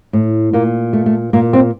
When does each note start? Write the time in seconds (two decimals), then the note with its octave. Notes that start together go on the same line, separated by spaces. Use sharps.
0.13 A2
0.53 A#2 A#3
0.93 A3
1.06 A3
1.33 A#2 A#3
1.53 C4